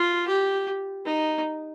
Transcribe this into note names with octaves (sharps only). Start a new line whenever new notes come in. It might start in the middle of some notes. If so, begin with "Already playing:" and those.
Already playing: F4
G4
D#4